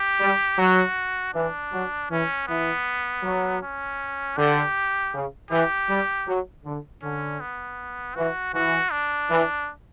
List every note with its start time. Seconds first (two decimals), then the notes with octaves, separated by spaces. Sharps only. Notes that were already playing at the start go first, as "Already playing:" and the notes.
Already playing: G4
0.20 G3
0.58 F#3 F#4
1.34 E3 D4
1.72 F#3
2.10 E3 C#4
2.47 E3 B3
3.23 F#3
3.62 C#4
4.37 D3 G4
5.13 C#3
5.51 E3 G4
5.89 G3
6.27 F#3
6.65 D3
7.03 D3 C#4
7.40 B3
8.16 E3 F#4
8.54 E3 F#4
8.92 D4
9.30 E3